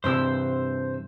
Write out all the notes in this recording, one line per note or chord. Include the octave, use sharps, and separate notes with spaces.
G2 C3 E3 C5 E6